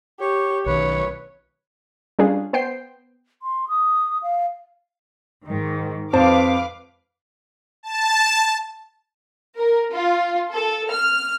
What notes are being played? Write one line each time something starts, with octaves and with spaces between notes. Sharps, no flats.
G4 C#5
B1 D#3 B4 C#5
G3 C#4 D4 F4 G#4
B3 C5 G5 C7
C6
D#6
F5
G#2 D#3
F2 B4 C5 F5 A5 D6
A5
A#4
F4
A4
F6